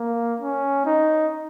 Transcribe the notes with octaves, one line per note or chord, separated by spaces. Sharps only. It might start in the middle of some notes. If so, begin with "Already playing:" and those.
Already playing: A#3
C#4
D#4